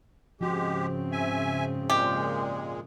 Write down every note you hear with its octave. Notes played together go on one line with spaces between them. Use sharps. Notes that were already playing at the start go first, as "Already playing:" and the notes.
G#2 C#3 F3 G#3 C4 F#4 G4
E5 G#5
A#2 G#3 G4